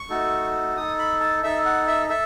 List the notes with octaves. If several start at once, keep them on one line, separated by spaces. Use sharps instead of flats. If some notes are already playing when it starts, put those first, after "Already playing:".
Already playing: C#6
A3 D#4 F#4 A4
D#4 A4 D#6
B5
A5
D#4 A4 E5
F#5
E5
A4 E5